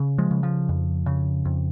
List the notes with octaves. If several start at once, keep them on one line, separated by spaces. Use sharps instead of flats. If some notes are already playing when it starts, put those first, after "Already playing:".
Already playing: C#3
F3 G#3
C#3
F3
F2
C#3
F2